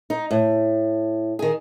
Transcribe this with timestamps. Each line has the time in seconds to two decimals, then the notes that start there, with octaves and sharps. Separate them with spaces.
0.10 D#4
0.31 A2
1.39 D#3 G#4